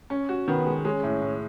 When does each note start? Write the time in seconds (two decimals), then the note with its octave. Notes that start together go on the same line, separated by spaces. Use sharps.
0.10 C#4
0.29 F#4
0.48 D#3 B3
0.66 G#3
0.84 G#3 C#4
1.03 A2
1.22 A2